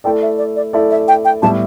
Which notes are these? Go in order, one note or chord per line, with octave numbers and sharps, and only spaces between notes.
A3 E4 A4 D5 G5
E5
D5
D5
A3 E4 A4 D5 E5
E5
G5
G5
A2 G3 B3 E4 A5